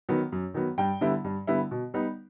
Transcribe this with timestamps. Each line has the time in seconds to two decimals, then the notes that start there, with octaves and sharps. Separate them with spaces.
0.09 D#3 F#3 B3
0.32 F#2
0.54 D#3 F#3 B3
0.78 G2 G5
1.01 D3 G3 B3 E4
1.24 G2
1.47 D3 G3 B3 E4
1.71 B2
1.94 G3 B3 D#4